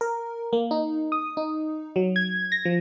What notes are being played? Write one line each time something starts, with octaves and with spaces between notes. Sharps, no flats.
A#4
A#3
D#4
D#6
D#4
F#3
G#6
A#6
F3